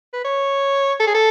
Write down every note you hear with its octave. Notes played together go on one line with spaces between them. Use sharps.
B4
C#5
A4
G#4
A4